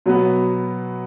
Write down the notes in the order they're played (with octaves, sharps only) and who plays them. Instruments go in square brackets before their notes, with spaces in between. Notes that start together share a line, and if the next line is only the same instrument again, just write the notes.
[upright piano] B2 F#3 B3